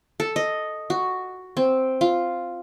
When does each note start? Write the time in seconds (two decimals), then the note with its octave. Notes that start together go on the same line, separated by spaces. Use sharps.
0.20 A4
0.36 D#5
0.90 F#4
1.57 C4
2.01 F4